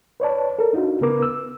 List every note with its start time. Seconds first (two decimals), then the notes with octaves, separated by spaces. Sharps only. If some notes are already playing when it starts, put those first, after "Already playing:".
0.20 B4 C#5 D5 A5
0.59 A4 A#4
0.73 D4 D#4 F4 F#4
1.01 C#3 B3 A#4 B4 D6
1.22 E6